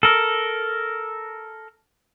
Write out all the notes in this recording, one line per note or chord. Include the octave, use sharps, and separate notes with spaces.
A4 A#4